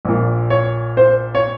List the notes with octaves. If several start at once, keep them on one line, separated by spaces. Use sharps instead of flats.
A#1 A#2
C#5
C5
C#5